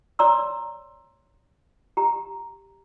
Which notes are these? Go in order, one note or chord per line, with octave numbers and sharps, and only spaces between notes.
C#5 D5 A#5 C6 E6
G4 A#5